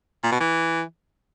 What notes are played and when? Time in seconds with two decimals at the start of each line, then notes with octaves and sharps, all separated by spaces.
0.24 A#2
0.32 B2
0.40 E3